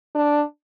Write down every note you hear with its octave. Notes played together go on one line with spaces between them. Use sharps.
D4